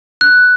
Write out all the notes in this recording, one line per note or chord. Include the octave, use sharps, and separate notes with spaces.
F#6